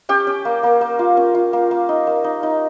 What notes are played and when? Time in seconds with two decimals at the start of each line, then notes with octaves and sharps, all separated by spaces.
0.09 C#4 G4 G5
0.27 C#4
0.45 A#3
0.63 A#3
0.81 A#3
0.99 F4
1.17 C#4
1.35 F4
1.53 A#3
1.71 A#3
1.89 D#4
2.07 A#3
2.24 D#4
2.43 D#4